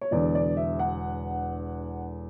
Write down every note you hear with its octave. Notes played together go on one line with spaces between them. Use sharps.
C#5
E1 E2 D3 D5
D5
E5
F#5